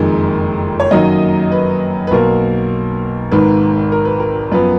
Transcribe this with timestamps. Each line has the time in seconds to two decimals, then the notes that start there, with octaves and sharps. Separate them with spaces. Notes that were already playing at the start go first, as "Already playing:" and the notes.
Already playing: F#1 F2 D#3 G#3
0.80 C#5
0.91 F#2 D#3 F#3 A#3 D#5
1.52 B4
2.07 B4
2.11 B1 B2 A#3 A#4
3.31 G#1 G#2 D#3 B4
3.92 A#4
4.05 B4
4.20 A#4
4.52 F#2 F3 B3 B4